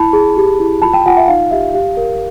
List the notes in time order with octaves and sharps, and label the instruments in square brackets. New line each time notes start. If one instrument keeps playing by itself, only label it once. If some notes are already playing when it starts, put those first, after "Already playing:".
Already playing: [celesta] E4 A5 B5
G#4
G4
E4
F4 A5 B5
G5 A5
F4 F#5 G#5
E5 F#5
D#4 F5
G4 E5
G4 F5
A#4